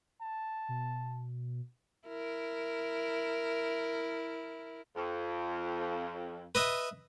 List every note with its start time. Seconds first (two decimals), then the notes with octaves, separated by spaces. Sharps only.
0.22 A5
0.68 B2
2.08 E4 A#4
4.96 F2
6.55 B4 D#5 E5